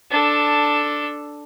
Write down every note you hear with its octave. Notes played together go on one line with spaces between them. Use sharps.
D4 A4